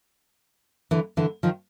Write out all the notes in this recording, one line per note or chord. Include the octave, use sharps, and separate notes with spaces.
D3 E3
D3 E3
D#3 F3